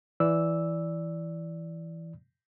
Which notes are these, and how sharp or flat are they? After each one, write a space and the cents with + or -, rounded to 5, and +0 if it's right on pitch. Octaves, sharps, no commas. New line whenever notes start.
E3 +5 D5 -10 E6 -5